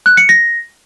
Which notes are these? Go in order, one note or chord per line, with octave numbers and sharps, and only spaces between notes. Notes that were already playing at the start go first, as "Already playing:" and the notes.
F#6
C#7
A#6